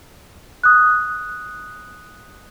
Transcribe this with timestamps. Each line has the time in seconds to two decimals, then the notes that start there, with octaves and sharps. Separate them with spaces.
0.64 D#6 F#6